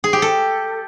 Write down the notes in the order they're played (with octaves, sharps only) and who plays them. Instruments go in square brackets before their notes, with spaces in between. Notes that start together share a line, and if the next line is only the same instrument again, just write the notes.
[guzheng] G#4
G4
A4